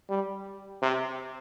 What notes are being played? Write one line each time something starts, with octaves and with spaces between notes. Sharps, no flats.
G3
C3